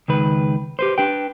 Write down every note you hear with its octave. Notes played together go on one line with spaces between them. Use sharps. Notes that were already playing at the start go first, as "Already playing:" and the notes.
C#2 D#3 B4
G4 B4 C5
D4 B4 G5